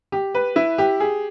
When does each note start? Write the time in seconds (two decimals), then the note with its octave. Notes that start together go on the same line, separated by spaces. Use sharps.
0.12 G4
0.34 B4
0.56 E4
0.78 G4
1.00 G#4